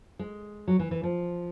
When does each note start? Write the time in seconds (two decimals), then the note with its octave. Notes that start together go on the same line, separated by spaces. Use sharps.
0.19 G#3
0.68 F#3
0.79 E3
0.91 E3
1.03 F3